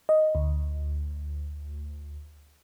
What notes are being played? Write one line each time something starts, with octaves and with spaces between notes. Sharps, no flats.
D#5
D2